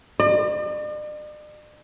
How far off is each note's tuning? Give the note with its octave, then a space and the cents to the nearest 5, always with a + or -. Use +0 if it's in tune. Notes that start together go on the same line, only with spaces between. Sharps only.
D5 +45